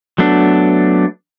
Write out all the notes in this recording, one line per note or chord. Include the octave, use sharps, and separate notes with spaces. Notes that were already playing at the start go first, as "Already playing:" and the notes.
F#3 A3 B3 D4